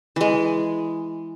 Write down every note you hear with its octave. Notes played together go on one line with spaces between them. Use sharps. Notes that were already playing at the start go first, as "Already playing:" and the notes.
E3 G#3